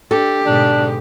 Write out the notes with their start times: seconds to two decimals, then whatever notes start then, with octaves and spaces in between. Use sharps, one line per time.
0.11 D4 G4 A4
0.45 G#2 B2 D3 D4